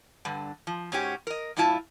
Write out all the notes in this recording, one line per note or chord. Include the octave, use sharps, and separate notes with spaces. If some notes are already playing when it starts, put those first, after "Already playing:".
G2 D3
F3
G#2 C#4 F#4 G4
A#4 D#5
G2 A#2 E4 F4 A5